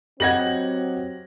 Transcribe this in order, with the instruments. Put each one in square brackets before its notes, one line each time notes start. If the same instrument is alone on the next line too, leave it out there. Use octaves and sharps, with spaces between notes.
[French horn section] F#3 C4 [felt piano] G4 D#5 F#5 [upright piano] G#6 A#6 F#7